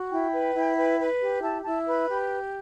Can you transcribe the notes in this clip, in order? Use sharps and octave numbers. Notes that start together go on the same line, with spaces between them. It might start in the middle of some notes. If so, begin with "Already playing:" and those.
Already playing: F#4
E4 G5
B4
E4
B4
B4
G4
E4 A5
E4 A5
B4 B5
G4